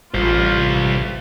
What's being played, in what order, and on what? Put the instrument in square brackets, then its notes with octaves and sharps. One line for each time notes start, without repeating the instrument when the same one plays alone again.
[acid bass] A1 [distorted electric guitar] G3 C5 [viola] F4